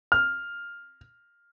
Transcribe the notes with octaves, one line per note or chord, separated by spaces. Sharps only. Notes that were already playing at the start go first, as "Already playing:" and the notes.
F6